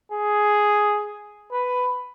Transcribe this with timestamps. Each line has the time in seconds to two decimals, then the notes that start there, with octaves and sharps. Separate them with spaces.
0.12 G#4
1.52 B4